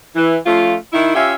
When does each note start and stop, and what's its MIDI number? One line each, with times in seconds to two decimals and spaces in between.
0.15 0.37 52
0.46 0.75 53
0.46 0.75 57
0.46 0.75 61
0.46 0.75 65
0.93 1.14 51
0.93 1.14 64
1.15 1.33 61
1.15 1.33 65
1.15 1.33 67
1.15 1.33 76